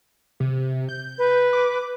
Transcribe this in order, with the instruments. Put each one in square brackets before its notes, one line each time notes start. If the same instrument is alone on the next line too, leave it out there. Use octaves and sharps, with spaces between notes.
[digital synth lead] C3
G6
[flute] B4
[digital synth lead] D6